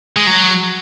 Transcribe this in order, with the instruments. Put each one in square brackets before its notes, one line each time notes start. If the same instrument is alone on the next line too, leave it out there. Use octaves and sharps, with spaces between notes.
[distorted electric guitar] G#3
F#3